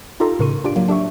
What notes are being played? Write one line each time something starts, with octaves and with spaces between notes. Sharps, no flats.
D#4 F4 G4 A4 A#5 C6
A2 C#3 A#4 C6 C#6 D#7
D4 F4 G4 D5 D7
F#3 A#3
D4 G4 E5 C#6